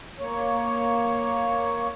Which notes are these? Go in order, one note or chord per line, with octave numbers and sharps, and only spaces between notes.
A#3 C#5